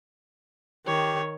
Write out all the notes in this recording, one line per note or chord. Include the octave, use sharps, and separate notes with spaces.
D#3 G4 C#5